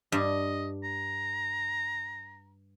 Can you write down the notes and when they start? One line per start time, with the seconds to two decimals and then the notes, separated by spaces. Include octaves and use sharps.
0.12 G2 D#5
0.84 A#5